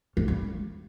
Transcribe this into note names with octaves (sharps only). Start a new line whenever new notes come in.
G3
G3